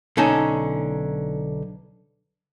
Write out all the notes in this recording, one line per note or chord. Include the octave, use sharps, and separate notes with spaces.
B1 D3 C#4 D#4 A5